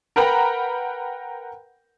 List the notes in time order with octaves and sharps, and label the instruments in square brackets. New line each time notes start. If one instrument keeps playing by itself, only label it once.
[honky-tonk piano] A#4 B4 F#5 G5 A#5 B5